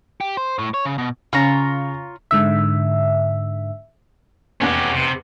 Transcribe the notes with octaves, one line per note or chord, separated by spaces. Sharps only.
G4
C5
A2
C#5
C#3
B2
C#3 F4 C#5 A#5
G#2 D3 E5
F1 E2 C#4 G4 F#5
C3